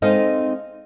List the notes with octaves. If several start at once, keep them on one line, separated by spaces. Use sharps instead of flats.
G#3 C4 D#4 A4 D#5 F5